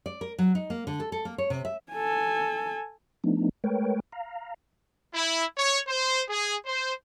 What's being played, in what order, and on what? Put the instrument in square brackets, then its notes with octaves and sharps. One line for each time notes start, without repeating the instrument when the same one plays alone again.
[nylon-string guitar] D5
A#4
F#3
D#4
A#3
D3
A4
A4
A#3
C#5
C3
E5
[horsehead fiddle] A4 G#5
[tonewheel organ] F3 A3 B3 D4 D#4
G#3 A3 A#4 B4 C#5 G5
F5 A#5
[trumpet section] E4
C#5
C5
G#4
C5